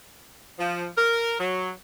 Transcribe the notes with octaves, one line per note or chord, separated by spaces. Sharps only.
F3
A#4
F#3